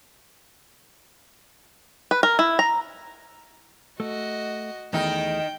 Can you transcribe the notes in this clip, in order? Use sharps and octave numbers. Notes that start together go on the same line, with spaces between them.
B4
A#4
E4
A#5
A3 F#4 D#5
E2 D#3 E3 A3 D#4 G5